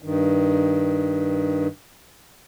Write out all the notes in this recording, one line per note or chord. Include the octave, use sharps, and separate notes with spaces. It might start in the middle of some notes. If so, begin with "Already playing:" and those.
G2 D#3